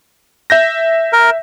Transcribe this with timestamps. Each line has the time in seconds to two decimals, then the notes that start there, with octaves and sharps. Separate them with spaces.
0.50 E5 G6 A#6
1.13 A#4